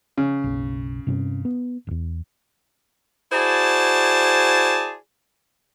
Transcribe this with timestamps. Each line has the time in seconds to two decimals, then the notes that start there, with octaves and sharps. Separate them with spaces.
0.18 C#3
0.44 F#1 B1
1.07 G2 C3 C#4
1.45 B3
1.87 D1 E2
3.32 E4 F#4 G#4 C5 D5 A5